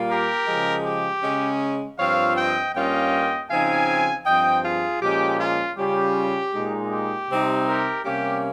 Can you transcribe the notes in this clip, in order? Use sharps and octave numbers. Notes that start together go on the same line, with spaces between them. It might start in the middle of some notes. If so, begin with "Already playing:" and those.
Already playing: A#2 G3 A#3 F4
G4 A#4
C#3 F3 G#3
G4
C#3 G#3 C#4
G2 F3 C4 F4 C#5 F5
D#5 G5
G2 G3 A#3 C#4 F4 D#5 G5
C#3 F3 C4 D#4 F5 G#5
G2 F3 C4 D#5 G5
F4 G#4
A#2 F3 G#3 C#4 G4
F4
C#3 G3 C#4 F4 G4
A#2 G#3 D#4
G4
C3 G3 C4 D#4
G4 A#4
C3 G3 A#3 C#4 G4